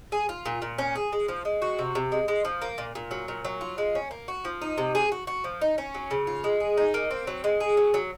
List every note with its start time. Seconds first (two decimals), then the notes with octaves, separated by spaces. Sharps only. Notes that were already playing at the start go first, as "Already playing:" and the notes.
0.12 G#4
0.29 F4
0.46 A#2
0.62 A#2
0.78 C#4
0.95 G#4
1.13 G#3
1.28 F3
1.45 G#3
1.62 F#4
1.79 C3
1.95 C3
2.12 G#3
2.28 G#3
2.45 F3
2.62 A#3
2.78 A#2
2.95 A#2
3.11 F#3
3.28 A#2
3.45 F#3
3.61 F4
3.78 G#3
3.95 C#4
4.11 A#3
4.28 F#4
4.45 F3
4.62 D#4
4.78 C3
4.95 G#4
5.12 F#4
5.27 F#4
5.44 F3
5.61 D#4
5.78 C#4
5.95 F#3
6.11 C#3
6.27 F4
6.44 G#3
6.60 G#4
6.77 D#4
6.94 A#3
7.11 C4
7.27 F#3
7.44 G#3
7.60 G#4
7.77 F#3
7.94 F#3